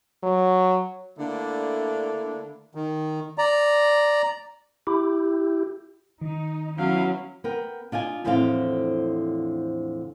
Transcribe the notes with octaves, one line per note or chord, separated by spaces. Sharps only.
F#3
D3 A3 A#3 D4 E4
D#3
D5 A#5
E4 G4
D#3 D#4
F#3 B3 C#4 E4 F5
B3 A#4 G5
D4 F4 D#5 G#5
E2 A2 D3 F3 C4 F5